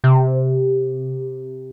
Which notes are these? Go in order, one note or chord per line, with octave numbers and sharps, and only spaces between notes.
C3